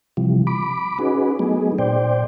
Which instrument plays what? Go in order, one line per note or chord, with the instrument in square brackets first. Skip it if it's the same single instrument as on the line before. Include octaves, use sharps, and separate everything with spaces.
[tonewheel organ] C3 E3 F3 G3
B5 D6
C#4 D#4 F#4 G#4 B4
F#3 A3 B3 D#4 G#4
A#2 C5 D5 G5